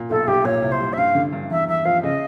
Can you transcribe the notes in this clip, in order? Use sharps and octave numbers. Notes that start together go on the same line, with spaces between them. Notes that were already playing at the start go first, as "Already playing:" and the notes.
Already playing: A#2
B1 A4
B1 G4
A#2 C#5
C2
C5
G3
E5
G2 F5
D3
G2
E2 E5
E2 E5
F3 F5
C#3 D#5